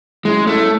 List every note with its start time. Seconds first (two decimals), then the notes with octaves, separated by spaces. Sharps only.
0.25 F#3 G#3 C#4 E4
0.47 A3